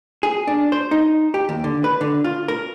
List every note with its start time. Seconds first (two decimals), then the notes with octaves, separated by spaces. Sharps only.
0.23 G#4
0.47 D4
0.72 C5
0.91 D#4
1.34 G4
1.49 D#2
1.64 D3
1.84 B4
2.01 D3
2.24 F4
2.48 A#4